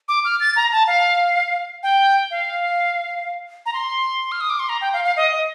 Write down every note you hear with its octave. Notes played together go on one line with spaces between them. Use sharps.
D6
F6
A6
A#5
A5
F5
G5
F5
A#5
C6
F6
D#6
D6
C6
A#5
G5
F5
F5
D#5
D#5